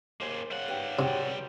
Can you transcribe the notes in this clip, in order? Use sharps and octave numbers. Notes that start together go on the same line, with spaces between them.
D#2 A#3 G#4 C5
C#3 G3 F#5
D#4 G4 B4
C3 F#3 G#4 B4 G5